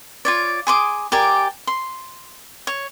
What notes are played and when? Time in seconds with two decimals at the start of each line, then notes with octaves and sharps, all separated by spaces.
0.25 F4 C#5 D5
0.67 G#4 C6 D6 D#6
1.12 G4 A#4 D5 G#5
1.67 C6
2.67 C#5